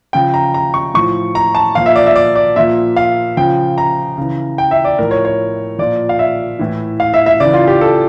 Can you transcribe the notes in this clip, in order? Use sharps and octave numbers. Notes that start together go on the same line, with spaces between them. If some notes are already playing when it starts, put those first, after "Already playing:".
C#3 F3 G5
A#5
A#5
C#6
A2 F3 C#6
A#5
A5
A#2 F3 F5
E5
D5
E5
D5
D5
A#2 F3 E5
F5
C#3 F3 G5
A#5
C#3 E3
G5
E5
D5
A2 F3 A#4
C#5
C#5
A#2 F3 D5
F5
E5
A2 E3
F5
E5
E5
C#3 E3 D5
F4
G4
A4